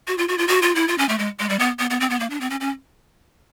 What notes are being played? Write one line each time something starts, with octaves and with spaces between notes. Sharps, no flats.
F#4
F4
F#4
F4
F#4
F4
E4
F4
C#4
A3
G#3
G#3
G3
B3
B3
B3
C4
B3
A#3
D4
C4
C#4
C#4